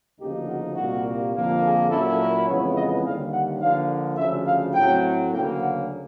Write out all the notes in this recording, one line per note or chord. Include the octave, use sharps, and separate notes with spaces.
D2 C#3 F3 A#3 D#4 G4
F#4
C2 A#2 G3 A#3 F#4
F2 D3 F3 A#3
G#4
A#2 F#3 A#3 C#4 E4 A4
A#4
F2 C#3 E3 G#3 B3 C#5
D#5
D#2 D3 G3 F5
F#5
D3 F3 A#3 F5
D2 C#3 F3 E5
F5
A2 F#3 A3 C4 G5
D2 C#3 F#3 A#3 G5
F#5